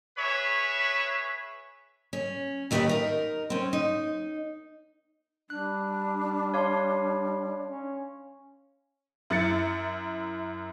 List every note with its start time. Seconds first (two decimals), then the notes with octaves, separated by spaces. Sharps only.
0.18 G#4 B4 C#5 E5 B5
2.13 C#4
2.71 D#2 A3 G4 G#4 B4 D#5
2.89 D#4 A#4
3.50 C4 C#4
3.73 D#4
5.50 G3 D4 F#6
6.54 C#5 F5 C6
7.64 C#4
9.30 F#2 E4 A6 C#7